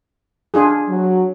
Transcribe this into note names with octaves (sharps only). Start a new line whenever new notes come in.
D4 F4 G#4
F#3